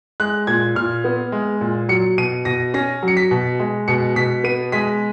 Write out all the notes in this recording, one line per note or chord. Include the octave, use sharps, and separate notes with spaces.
G#3 F#6
A#2 G#6
A#2 F6
B3
G#3
A#2
F#3 C#7
B2 D#7
B2 A#6
C#4 A#6
F#3
C#7
B6
B2
G#3
B2 C#7
B2 B6
B3 D#7
G#3 B6